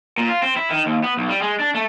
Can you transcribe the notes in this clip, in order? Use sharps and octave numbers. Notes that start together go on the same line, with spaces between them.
A#2
F4
C4
E4
D#3
D#2
B3
B1
G3
G#3
D4
A3